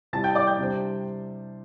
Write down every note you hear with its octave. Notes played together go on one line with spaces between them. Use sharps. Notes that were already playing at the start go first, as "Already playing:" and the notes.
C3 G3 E4 A5 A6
G5 G6
D5 D6
G5 G6
C3 G3 D4 C5